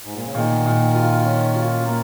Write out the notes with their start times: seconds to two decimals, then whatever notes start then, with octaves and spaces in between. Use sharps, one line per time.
0.04 G#2
0.14 A#2
0.25 C#3
0.34 A#2 D#3
0.65 A#2
0.94 F4
1.25 C#4
1.55 F4
1.85 A#3